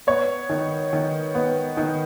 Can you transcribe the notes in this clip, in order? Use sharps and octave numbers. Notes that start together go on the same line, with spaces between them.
B3 C#5
D#3
D#3
B3
D#3